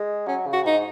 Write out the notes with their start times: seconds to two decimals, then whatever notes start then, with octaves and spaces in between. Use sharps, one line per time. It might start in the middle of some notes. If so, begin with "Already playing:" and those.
Already playing: G#3
0.27 F#3 C#4
0.47 C#3
0.53 F#4
0.65 G#2 D#4